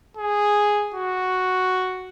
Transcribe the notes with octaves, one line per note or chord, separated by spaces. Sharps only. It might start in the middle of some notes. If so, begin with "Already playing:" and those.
G#4
F#4